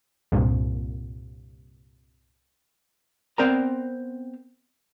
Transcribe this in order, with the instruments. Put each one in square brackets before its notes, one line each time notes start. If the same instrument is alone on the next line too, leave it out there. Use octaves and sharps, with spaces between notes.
[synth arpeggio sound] C2 G2 A#2
[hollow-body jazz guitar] B3 C4 A#4 D5 A#5